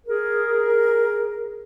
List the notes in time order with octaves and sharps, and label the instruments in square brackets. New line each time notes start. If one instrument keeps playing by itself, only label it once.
[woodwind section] G#4 A#4